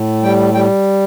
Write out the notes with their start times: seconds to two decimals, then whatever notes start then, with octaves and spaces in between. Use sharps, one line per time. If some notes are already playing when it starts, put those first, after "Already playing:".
Already playing: A2
0.23 G3 G5
0.54 G3 G5